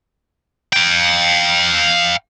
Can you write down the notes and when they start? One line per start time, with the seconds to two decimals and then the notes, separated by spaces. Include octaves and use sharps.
0.73 F5 G5